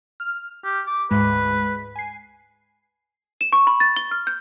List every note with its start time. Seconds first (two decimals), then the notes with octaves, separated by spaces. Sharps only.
0.20 F6
0.64 G4
0.87 D6
1.11 D2 G#2 G#3 B4
1.96 G#5 C7
3.41 E7
3.53 C#6
3.67 B5
3.80 A6
3.96 G7
4.11 F6
4.27 G6